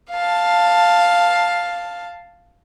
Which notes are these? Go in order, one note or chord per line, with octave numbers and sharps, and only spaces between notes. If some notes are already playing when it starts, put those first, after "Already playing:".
F5 A5